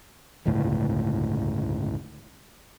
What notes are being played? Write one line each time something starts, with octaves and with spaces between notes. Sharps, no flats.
D1 G1 C#2 A2